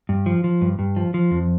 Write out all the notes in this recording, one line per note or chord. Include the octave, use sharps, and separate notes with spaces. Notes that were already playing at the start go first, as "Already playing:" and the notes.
G2
F3
F3
G2
G2
F3
F3
F2